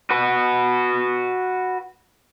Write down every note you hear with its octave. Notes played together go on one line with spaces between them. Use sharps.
F#4 B4